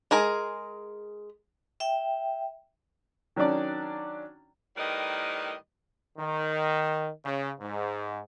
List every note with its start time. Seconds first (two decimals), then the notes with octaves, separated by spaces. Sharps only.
0.11 G#3 G#4 A#4
1.80 E5 G5
3.36 D#3 F#3 C#4 D4 D5
4.77 A2 D#3 G3 A#4 B4 D#5
6.18 D#3
7.23 C#3
7.59 G#2